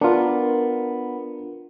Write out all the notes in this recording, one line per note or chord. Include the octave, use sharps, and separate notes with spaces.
B3 D4 F4 A#4